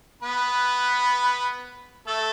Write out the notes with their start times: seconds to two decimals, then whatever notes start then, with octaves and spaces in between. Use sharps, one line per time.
0.22 B3 B4
2.07 A3 A4